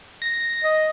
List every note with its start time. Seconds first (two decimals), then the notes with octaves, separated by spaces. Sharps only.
0.22 A#6
0.64 D#5